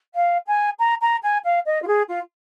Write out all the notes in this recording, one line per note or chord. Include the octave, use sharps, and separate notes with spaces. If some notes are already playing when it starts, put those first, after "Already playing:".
F5
G#5
A#5
A#5
G#5
F5
D#5
F4
G#4
F4